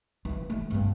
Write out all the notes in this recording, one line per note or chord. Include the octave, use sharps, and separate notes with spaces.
E3 F3
A3
G2 B3